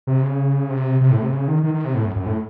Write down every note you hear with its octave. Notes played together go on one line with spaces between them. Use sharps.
C3
C#3
C3
C3
A2
C3
C#3
D#3
D#3
D#3
C3
A2
F#2
F#2
A2